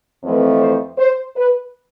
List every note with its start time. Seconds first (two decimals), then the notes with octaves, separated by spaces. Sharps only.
0.24 F2 E3 A3 C4 B4
0.61 C5
0.98 C5
1.36 B4